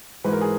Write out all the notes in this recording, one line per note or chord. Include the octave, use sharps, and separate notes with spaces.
G#2 E3 B4
A#4
G#4